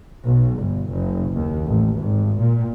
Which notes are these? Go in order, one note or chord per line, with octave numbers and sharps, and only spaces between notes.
B1
G1
F#1
D#2
A1
G#1
A#2